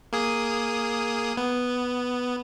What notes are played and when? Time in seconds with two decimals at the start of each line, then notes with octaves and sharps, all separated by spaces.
0.13 A#3 G#4 D#6
1.37 B3